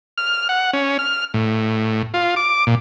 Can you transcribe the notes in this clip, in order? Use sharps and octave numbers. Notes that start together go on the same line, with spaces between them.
F6
F#5
C#4
F6
A2
F4
D6
A#2